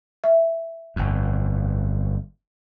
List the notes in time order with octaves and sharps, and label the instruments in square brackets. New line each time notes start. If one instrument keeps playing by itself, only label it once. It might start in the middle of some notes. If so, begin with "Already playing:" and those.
[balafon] E5
[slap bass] G1 F2